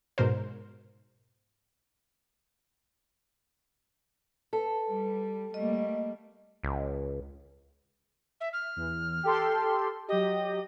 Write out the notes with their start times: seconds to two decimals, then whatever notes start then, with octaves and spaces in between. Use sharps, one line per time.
0.18 G#2 B2 A#4 C5
4.53 A4 B4
4.90 G3
5.54 G3 A3 A#3 D#5
6.63 C#2
8.40 E5
8.53 F6
8.76 E2
9.23 G4 A4 C6
10.08 F#3 G4 D#5